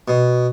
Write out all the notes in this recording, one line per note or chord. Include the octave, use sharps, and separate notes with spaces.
B2